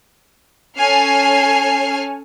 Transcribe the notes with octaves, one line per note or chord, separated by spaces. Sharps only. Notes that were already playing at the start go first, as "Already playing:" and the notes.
C#4 A4 C#5 G#5 F6 C7